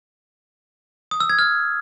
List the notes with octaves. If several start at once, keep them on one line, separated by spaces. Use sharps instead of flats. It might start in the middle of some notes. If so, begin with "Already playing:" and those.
D#6
E6
G#6
F6